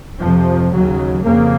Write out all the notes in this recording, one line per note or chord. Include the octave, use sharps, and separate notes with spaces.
F2 C3 F3
D#2 C#3 F#3
F2 C#3 A#3